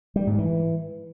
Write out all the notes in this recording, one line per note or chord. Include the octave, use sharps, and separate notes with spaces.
G3
G#2
E3